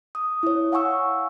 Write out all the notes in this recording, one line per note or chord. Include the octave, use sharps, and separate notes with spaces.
D#6
E4 C#5
F5 F#5 G#5 C#6 E6